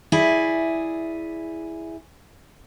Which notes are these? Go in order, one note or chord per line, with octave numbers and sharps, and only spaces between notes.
E4 G#4 D5